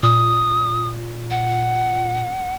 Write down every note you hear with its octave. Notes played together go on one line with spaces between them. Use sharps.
A#2 D#6
F#5